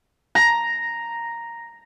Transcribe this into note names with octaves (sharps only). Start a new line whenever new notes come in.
A#5